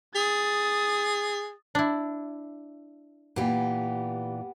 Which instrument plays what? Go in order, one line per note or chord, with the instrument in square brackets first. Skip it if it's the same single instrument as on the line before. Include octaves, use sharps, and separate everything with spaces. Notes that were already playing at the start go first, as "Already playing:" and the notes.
[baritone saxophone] G#4 [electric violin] D#6 A6
[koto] D4 E4
[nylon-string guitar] A#2 E3 [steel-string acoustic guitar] B3 G4